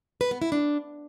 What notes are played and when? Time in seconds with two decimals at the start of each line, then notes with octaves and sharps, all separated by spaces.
0.21 B4
0.31 B3
0.42 E4
0.52 D4